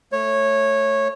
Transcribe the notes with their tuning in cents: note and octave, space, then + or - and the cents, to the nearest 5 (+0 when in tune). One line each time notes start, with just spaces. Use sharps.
A3 +0 C#5 -15